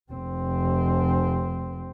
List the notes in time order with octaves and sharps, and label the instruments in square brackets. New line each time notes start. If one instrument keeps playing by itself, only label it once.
[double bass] F1 C4